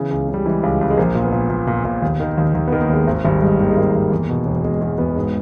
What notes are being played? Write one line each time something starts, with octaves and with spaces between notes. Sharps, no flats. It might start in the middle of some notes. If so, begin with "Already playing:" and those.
Already playing: C#3 E3 B3
C#2
C#3
G3
E3 G#3
C#2
C#2
G#3
A#1 A#3
A#2
B3
A#2
A#2
A#2
A#2
D#2
D#3
D#2
D#2
B3
D#3
A#3
D#2 G#3
G#1
G#1 G3
G2 G#3
D#3 A#3
G#3
G#1 A#3
G#1
E2
B2
E1
E1 G#3
E2 G#3
E1 B3
G#2